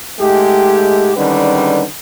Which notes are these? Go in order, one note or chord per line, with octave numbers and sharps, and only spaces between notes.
G#2 G#3 A3 G4
D3 D#3 G3 G#3 C#4 B4